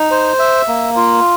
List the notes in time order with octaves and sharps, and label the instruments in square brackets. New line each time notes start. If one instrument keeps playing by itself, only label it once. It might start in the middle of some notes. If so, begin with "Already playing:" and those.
Already playing: [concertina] D#4
C5
E5
A#3
F4